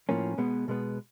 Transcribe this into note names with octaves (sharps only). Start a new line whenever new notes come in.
A2 F3 A#3 C#4
B2 G#3 B3
B2 G#3 B3